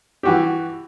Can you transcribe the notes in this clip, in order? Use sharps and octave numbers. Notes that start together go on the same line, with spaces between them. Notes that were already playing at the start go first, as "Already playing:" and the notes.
E3 F#4 G4